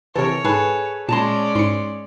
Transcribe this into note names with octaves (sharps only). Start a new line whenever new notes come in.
C3 E3 A4 A#4 C#5
G#2 G#4 A4 B4
A#2 G#3 C#4 D5 A5 A#5 C6
G#2 C6 C#7